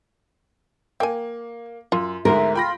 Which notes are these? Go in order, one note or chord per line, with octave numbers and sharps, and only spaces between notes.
A#3 G5 G#5
F#2 F4
D2 G#2 G#3 A#4 E5
F4 G5 B5 A#6